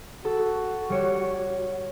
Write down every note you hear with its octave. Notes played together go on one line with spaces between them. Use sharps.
F#4 A4
G3 C#5 E7